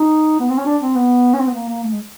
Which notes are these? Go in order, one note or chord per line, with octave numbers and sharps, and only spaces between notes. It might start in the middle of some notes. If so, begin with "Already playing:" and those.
Already playing: D#4
B3
C4
C#4
D4
C4
B3
C#4
C4
B3
A#3
A#3
A3
G#3